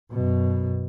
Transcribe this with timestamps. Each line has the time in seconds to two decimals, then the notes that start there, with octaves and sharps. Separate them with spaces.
0.11 F#2 B2